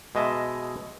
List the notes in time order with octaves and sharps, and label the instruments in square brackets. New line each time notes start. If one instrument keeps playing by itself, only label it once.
[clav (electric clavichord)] B2 G#3 D#5 E5 A5